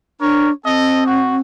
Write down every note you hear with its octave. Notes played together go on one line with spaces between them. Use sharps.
D4 A#4 C#5
C4 A4 D#5
F#4